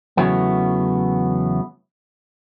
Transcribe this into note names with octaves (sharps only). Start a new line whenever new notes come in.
E2 C#3 E3 F#3 A3 B3